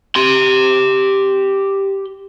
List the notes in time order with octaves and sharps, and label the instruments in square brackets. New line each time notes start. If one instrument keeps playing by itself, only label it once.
[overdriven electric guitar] G4 C6